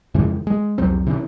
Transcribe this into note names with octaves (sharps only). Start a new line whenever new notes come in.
F2 C#3 E3 G#3
G#3
C2 F2 F#3 C4
C3 E3 C#4